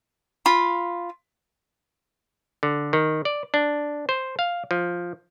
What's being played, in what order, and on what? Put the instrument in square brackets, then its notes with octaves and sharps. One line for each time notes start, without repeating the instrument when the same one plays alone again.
[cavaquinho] F4 B5
[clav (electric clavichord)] D3
D#3
D5
D4
C5
F5
F3